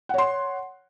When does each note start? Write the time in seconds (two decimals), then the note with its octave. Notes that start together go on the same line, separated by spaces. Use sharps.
0.09 F#5
0.14 C#5
0.18 C6